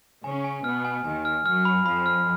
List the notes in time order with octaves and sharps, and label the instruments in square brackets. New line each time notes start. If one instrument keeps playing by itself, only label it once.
[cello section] C#3 C#4 [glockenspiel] G#5
[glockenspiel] G#5
[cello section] B2 B3 [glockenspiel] F6
[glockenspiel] G#5
[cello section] D#2 D#3 [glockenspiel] G#5
[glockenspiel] F6
[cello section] F#2 F#3 [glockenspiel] F6
[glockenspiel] B5
[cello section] F2 F3 [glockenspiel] B5
[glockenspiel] F6